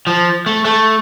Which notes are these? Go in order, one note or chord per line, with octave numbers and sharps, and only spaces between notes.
F3
A3
A3